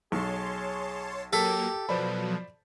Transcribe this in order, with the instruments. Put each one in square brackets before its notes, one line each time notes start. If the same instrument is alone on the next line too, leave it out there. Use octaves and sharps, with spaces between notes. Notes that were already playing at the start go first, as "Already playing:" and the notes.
[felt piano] B1 [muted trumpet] G#4 [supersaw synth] C#5 A5 C6
[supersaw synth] F#3 A#3 A#4 [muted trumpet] G4 [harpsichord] A4 [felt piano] A5 B6
[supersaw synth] B2 F3 F#3 [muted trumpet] B4 [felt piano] C5 D5 B5